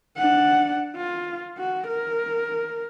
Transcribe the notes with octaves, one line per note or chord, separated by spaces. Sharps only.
D4 F#5
F4
F#4
A#4